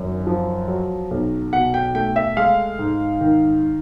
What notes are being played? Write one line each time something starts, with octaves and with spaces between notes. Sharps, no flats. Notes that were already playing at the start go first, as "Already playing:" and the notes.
Already playing: G#1 F#2
F3
F#3
B1
B2 F#5
G5
A3 G5
E5
G#3 F5
G#2
D#3